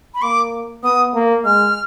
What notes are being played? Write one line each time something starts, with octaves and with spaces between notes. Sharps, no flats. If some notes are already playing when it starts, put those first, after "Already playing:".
B5
A#3 D6
B3 D#6
A#3
G#3 F6